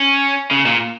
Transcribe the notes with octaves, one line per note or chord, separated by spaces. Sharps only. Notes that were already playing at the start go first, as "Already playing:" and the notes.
Already playing: C#4
C#3
A#2